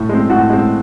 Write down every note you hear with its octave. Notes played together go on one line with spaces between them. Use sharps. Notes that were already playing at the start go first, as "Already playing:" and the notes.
Already playing: A2
G#3 C4
A2 F#4
G#3 C4